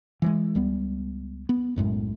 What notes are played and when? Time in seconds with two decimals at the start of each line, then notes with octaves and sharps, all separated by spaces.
0.22 E3 F#3 G#3
0.55 C#2 G3 B3
1.49 B3
1.76 B1 F#2 A2 G#3